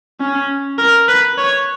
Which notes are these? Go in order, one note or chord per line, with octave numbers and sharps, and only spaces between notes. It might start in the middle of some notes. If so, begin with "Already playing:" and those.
C#4
A#4
B4
C#5